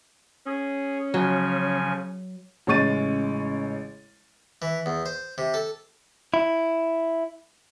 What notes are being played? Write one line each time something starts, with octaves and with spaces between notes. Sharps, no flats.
C#4 G#4
C#3 F3 F#3 G#5
A1 C#3 G#3 C#6 A6 D#7
E3
E2
C5
C3
A4
E4